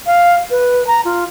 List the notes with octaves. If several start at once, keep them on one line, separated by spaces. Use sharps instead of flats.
F5
B4
A#5
F4